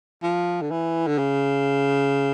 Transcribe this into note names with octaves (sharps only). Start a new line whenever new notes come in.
F3
D3
E3
D3
C#3